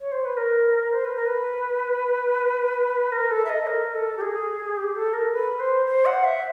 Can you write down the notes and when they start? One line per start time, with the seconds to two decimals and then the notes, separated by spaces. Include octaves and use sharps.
0.01 C#5
0.12 C5
0.25 B4
0.37 A#4
0.92 C5
1.04 B4
1.16 A#4
1.26 B4
3.12 A#4
3.31 A4
3.45 E5
3.49 D#5
3.67 A#4
3.95 A4
4.17 G4
4.21 G#4
4.77 G4
4.95 A4
5.13 A#4
5.32 B4
5.60 C5
5.86 C5
6.06 F#5
6.24 E5